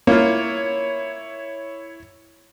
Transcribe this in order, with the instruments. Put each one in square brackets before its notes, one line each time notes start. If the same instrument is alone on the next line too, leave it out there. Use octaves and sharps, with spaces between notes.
[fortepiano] A#3 F4 [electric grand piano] E4 C#5